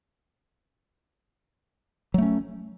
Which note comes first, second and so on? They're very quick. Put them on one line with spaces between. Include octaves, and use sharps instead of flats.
F#3 A3 C#4